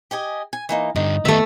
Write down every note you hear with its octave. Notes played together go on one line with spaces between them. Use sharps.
G4 D#5 G#5
G#5
E3 A#3 D#4
G2 D3 D#4
D#3 A3 B3 E5